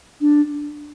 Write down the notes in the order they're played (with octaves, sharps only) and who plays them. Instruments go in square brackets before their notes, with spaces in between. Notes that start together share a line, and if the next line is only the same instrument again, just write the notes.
[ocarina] D4